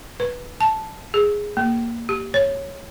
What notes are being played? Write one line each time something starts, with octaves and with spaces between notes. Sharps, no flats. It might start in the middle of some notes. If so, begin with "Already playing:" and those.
B4
A5
G#4
A#3
G4
C#5